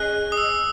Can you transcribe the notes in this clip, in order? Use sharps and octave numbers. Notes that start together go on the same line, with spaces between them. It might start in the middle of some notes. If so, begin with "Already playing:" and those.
Already playing: C#4 G#4 D#5 F#6
D#6
E6